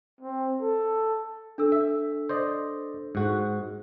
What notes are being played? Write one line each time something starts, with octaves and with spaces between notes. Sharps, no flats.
C4
A4
D4 A4 E6
E5
C5 D5 D#5
G#2 F#4